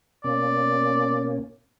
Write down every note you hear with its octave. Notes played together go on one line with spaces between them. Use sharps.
B2 A#3 C#4 D5